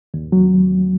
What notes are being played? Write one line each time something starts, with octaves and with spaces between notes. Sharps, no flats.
D#2
F#3